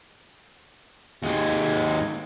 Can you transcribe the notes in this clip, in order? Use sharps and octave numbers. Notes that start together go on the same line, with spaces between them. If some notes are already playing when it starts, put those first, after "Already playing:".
D#2 G#3